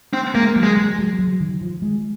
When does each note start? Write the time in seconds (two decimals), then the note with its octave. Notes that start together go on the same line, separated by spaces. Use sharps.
0.13 C4
0.35 G#3 A#3
0.56 F#3
0.63 G#3
0.77 G#3
0.99 F#3
1.19 F#3
1.40 D#3
1.61 F3
1.82 G#3